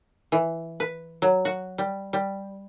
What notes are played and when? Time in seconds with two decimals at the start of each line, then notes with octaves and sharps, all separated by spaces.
0.32 E3
0.80 B4
1.22 F#3
1.45 F#4
1.78 G3
2.13 G3